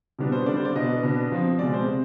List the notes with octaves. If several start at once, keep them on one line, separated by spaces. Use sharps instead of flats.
B2 G3 B3 D4
C5
D3 G3 D4 D5
C5
D5
B2 B3 D4 D#5
B2 B3 D4
F3 C4
B2 G#3 C4 D5
C5
C3